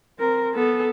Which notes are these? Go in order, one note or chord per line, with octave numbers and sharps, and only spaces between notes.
C4 A#4
B3 A4